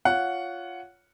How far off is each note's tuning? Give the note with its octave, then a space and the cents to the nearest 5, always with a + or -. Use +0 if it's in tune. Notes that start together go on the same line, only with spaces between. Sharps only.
F4 +0 C#5 +15 F#5 +0